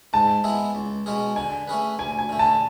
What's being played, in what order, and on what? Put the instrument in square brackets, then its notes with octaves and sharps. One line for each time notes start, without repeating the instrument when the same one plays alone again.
[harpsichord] G#2 [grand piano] A5
[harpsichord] G#3 B3 E4 G#4
C#2
B2 G#3 C#4 G#4
[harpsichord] D3 [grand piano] G#5
[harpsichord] A3 C#4 G#4 B4
[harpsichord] D2 [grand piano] G#5
[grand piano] G#5
[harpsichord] D3 A3
[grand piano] A5